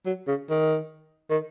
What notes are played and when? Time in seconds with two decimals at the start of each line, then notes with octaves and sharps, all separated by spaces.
0.06 F#3
0.27 C#3
0.49 D#3
1.30 D#3